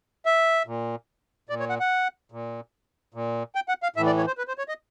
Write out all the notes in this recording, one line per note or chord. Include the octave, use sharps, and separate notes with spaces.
E5
A#2
A#2 D5
C#5
F#5
F#5
A#2
A#2
G5
F#5
F5
A2 E3 E5
D5
C#5
C5
B4
C5
C#5
D#5